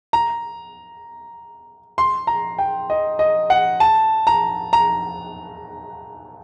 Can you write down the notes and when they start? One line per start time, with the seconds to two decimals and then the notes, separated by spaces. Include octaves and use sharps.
0.13 A#5
1.98 C6
2.27 A#5
2.59 G5
2.90 D#5
3.19 D#5
3.50 F#5
3.80 A5
4.27 A#5
4.73 A#5